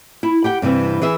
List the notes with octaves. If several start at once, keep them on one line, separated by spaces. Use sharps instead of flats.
E4
G4 F#5 G5
G2 C3 E3 C4
E3 G#4 E5